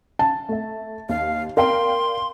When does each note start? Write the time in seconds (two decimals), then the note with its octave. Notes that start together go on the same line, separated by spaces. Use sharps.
0.19 A5
0.49 A3 E5
1.09 D#2 F5
1.57 A#4 D5 F5 G5 C6